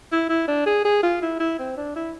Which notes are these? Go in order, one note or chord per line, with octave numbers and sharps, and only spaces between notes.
E4
E4
D4
G#4
G#4
F4
E4
E4
C4
D4
E4